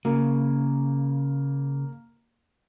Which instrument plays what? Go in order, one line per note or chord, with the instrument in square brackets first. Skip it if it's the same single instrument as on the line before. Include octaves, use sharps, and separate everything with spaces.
[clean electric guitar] C#3 [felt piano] A#3